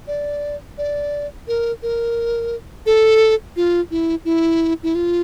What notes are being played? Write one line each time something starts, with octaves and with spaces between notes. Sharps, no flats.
D5
D5
A#4
A#4
A4
F4
E4
E4
E4
F4